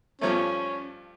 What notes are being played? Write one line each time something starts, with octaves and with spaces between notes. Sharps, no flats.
G2 F3 A3 C#4